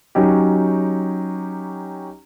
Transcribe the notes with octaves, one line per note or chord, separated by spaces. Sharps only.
F#3 C#4 D#4 G4